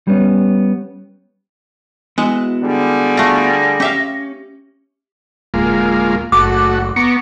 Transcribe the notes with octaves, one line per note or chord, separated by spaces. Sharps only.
G3 B3 C#4
G#3 B3 E4 F#4
D3 G3 G#4
A3 F4 A#6
C#4 G4 E5 F5
D1 G#3 A#3 F4
F#1 A3 F#4 D6
B3 A#5 C#6 D6 C#7